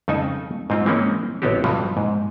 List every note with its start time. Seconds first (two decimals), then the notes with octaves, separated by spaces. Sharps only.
0.08 F2 C#3 D#4 A4 G#5
0.70 G#2 C4 F4
0.86 E3 G#3 A#3 C4 C#4
1.42 A1 B3 C4 F#4 G4
1.64 G2 B2 E3 F3
1.97 G#2